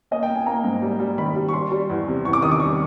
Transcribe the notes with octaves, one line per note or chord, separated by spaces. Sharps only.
A#3 D#5
G5
A#3
G#5
A#3 A#5
G#2
G3
G3
D#3 B5
G3
C#6
G3 C6
G3
E2
C3
E2 C#6
D6
D#3 D#6
D6
G3 C#6